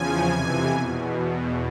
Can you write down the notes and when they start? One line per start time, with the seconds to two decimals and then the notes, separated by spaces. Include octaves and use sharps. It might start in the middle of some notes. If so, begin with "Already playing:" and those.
Already playing: E2 C#3 F3 G#5
0.27 F2 C3 E3
0.71 E2 B2